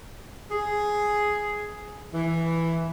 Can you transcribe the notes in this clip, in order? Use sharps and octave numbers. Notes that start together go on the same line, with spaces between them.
G#4
E3